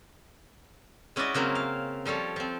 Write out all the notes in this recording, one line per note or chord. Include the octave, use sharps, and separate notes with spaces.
G#3 C#4 E4 F#4 D5 D#5
C#3 F#3 A#3 C4
F5
F3 G3 A4 C#5
F3 C4